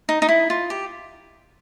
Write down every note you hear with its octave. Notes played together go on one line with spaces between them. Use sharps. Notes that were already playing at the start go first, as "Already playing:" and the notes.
D#4
D#4
E4
F4
G4